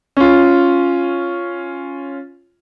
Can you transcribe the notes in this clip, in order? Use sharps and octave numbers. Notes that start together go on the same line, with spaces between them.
C#4 F4